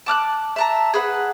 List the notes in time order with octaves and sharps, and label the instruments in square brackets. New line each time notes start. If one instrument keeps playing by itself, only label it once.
[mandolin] A5 D6 F6 F#6
E5 A5 A#5
G#4 B4 F#5